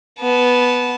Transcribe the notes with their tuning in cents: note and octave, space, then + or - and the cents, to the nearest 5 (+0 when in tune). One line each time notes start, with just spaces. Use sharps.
B3 +0 A5 -25